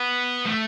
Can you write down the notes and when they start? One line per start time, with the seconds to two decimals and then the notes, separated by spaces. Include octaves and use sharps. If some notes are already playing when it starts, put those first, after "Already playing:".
Already playing: B3
0.46 A3